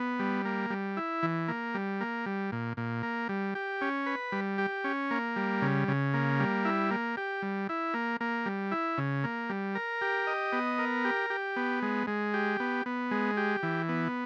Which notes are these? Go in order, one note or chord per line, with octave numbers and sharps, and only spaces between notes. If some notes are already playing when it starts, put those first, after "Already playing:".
Already playing: B3
G3
A#3
G3
E4
E3
A#3
G3
A#3
G3
A#2
A#2
A#3
G3
G4
C#4
B4
G3
G4
C#4
A#3
G3
C#3
C#3
A#3
G3
E4
A#3
G4
G3
E4
A#3
A#3
G3
E4
C#3
A#3
G3
A#4
G4
D#5
B3
A#4
G4
G4
B3
G#3
G#3
G4
B3
B3
G#3
G4
E3
B3